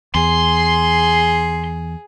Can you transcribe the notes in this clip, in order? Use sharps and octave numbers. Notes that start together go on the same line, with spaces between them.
E2 G#4 C6